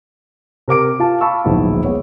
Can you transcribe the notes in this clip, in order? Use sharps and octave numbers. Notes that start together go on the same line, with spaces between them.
C3 A#4 D6 D7
F4 F5 A5
F5 A5 B5 C#6 E6
D1 A#1 G#2 B3 E4 F#4
G#3 B3 C#5